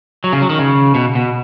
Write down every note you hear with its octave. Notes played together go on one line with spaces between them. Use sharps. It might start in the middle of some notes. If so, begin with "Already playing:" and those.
F#3
C#3
F#3
D#3
C#3
B2
B2